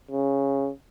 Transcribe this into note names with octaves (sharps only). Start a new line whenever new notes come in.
C#3